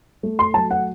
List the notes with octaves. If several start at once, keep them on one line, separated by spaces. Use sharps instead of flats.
A3
C6
F#3 A5
F#5